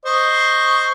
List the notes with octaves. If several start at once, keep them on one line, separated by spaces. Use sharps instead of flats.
C5 D#5 C#6